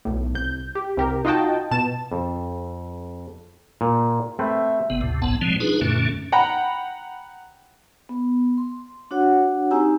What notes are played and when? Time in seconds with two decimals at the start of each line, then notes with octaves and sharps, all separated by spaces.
0.05 B1 A2
0.34 C2 G6
0.75 G4
0.97 C2 G4 A#4
1.25 D#4 F4 F#4 D#5 G5 A5
1.71 B2 A5 E7
2.12 F2
3.81 A#2
4.39 A3 C4 B4 E5
4.90 G1 C3 B3
5.01 D2 A2 C3
5.22 F#1 C2 G#2 B3 A5
5.41 B2 F3 G3 G#3 C4
5.60 D4 D#4 F4 G#4 B4
5.81 F#2 A#2 D3 A3 C#4
6.32 F#5 G5 A#5 B5
8.09 B3
8.58 C6
9.11 D4 F#4 C#5 F#5
9.71 C4 D#4 G4 G#5 A#5 E6